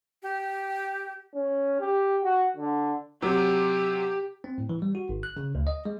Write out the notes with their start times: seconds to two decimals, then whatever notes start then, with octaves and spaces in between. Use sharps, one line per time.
0.23 G4
1.34 C#4
1.80 G4
2.24 F#4
2.57 D3
3.22 C3 F#3 G4
4.44 C4
4.58 A2
4.69 E3
4.82 G3
4.95 F#4
5.09 G#1
5.23 F#6
5.37 C#3
5.55 D2
5.67 D#5
5.85 G#3